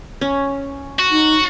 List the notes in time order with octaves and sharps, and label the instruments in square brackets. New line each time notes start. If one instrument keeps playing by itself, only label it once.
[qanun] C#4
[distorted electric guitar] F#4
[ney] D#4